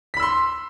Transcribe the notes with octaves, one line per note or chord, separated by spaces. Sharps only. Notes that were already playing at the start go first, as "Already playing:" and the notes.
B5 C6 E6 B6